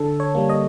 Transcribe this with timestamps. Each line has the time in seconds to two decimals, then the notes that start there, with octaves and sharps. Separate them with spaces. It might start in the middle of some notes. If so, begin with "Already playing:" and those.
Already playing: D3 A4
0.20 C#5
0.35 G3 A#3
0.49 D#5